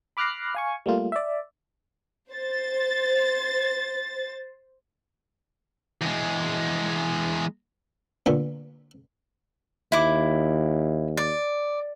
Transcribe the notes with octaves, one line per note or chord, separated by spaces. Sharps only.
B5 D6 F6 F#6 A#6 C7
F5 G#5 C#6
G3 A3 A#3 F4
D5 E5
C5 A6
E2 G#3
A#2 D3 B3
D#2 E4 D6
D5